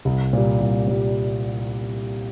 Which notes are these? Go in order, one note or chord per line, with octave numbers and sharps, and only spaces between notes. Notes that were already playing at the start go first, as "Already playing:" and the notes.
C2
A#2 G3
C2
A#2 G3